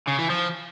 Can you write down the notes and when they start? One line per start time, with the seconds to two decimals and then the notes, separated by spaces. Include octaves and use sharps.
0.07 C#3
0.19 E3
0.30 F3